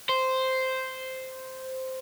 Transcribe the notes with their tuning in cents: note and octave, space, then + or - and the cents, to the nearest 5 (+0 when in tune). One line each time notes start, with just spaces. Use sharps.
C5 -5